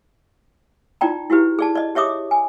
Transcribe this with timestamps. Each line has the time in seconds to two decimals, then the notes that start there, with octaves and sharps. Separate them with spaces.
1.01 D#4 F4 D5 G5 A#5
1.30 E4 F#4 G4 B4
1.59 G#4 D5 A5
1.75 D5 D#5
1.95 G4 C#5 E5 D6 D#6
2.31 G#5